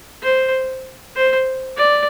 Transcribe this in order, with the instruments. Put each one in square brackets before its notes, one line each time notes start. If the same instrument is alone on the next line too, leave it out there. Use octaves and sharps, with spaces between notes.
[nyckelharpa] C5
C5
D5